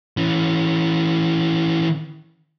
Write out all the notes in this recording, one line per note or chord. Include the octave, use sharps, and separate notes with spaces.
E3 C#4